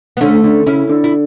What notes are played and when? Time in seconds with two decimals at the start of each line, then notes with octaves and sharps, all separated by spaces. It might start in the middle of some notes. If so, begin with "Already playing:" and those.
0.17 B3
0.21 D3 A3 C#4
0.44 D3
0.66 C#3 C#4 E4
0.89 D3
1.04 E4